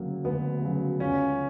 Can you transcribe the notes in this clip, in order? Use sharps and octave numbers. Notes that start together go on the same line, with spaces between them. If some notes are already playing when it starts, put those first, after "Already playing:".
Already playing: D2 C#3 F#3 A#3
D2 B3
C#3 F#3
C#2 C#4